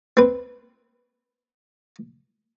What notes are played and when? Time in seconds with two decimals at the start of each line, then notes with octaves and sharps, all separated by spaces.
0.17 C4 B4